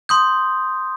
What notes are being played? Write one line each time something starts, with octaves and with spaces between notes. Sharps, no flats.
C6 D#6 G6